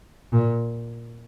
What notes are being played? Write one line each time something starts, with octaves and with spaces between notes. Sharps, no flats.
A#2